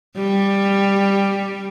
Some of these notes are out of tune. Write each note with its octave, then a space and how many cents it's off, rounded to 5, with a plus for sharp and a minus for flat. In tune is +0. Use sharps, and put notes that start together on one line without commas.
G3 +10